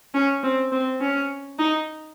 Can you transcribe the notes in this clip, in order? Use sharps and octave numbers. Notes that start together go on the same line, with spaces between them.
C#4
C4
C4
C#4
D#4